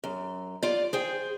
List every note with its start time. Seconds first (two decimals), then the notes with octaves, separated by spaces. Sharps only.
0.04 F#2
0.63 F4 D5
0.93 G#4 C5 G5